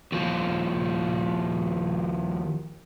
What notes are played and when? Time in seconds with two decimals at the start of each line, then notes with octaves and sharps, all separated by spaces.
0.12 D#2 F3